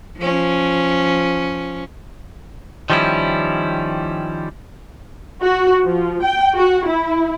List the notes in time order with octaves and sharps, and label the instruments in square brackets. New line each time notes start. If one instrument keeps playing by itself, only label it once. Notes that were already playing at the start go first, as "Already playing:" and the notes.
[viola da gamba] F3 C#4
[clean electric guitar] D#3 F3 G3 C#4 E4
[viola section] F#4
F3
G5
F#4
E4